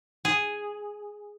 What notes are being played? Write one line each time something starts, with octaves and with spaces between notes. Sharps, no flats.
G#4